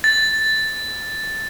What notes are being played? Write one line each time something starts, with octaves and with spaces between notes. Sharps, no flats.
A6